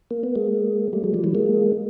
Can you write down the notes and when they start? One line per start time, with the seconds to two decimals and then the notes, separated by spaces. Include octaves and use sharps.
0.11 A#3
0.23 B3
0.35 G#3 A#3
0.93 G3 A3
1.04 F#3 G#3
1.14 F3 G3
1.24 E3 F#3
1.35 G#3 A#3